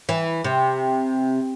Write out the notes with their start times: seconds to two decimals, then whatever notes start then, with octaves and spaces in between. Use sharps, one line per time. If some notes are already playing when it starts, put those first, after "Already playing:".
0.09 E3
0.44 C3